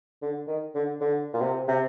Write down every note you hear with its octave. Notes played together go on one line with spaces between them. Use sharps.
D3
D#3
D3
D3
A#2
C3
C3